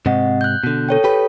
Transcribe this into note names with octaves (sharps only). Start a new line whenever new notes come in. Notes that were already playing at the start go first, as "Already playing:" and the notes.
G#2 C3 C4 D#5 F#5
F#6 G6
B2 D3
A4 C#5 G5
G4 B4